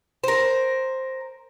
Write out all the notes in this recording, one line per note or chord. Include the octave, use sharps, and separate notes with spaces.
A#4 C5